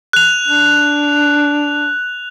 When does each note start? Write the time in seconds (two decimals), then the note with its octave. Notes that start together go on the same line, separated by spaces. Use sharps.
0.13 F#6 F7
0.48 D4